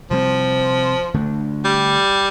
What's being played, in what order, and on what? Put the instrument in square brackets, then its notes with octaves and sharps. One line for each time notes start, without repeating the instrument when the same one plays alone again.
[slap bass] C3 G3 C4 [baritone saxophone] F3
[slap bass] D3 A3 D4
[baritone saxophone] G3